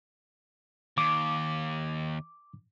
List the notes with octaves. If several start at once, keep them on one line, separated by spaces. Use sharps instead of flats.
D#2 D6